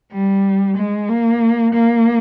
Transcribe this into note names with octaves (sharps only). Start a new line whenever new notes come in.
G3
G#3
A#3
A#3